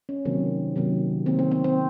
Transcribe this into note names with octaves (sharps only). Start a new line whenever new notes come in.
C#4
C3 D#3 F#3 A#3 C4
C3 D#3 F#3 A#3
D#3 A#3 C4
C4
C4
C4